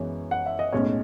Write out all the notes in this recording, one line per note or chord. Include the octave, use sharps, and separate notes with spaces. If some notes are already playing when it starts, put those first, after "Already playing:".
Already playing: F#2 E3 G#3 B3 C#5
F#5
E5
D#5
B1 A2 G#3 C#4 C#5